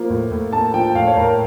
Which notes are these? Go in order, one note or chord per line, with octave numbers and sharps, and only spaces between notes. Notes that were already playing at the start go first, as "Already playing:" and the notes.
Already playing: F3 A#3
A2
A2
A#3 A5
F3 G5
A2 F5
C#5
A2 A#4